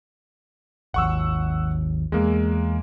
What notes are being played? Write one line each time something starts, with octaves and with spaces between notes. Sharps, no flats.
G#1 D#2 F#5 C#6 E6
E2 G#3 A#3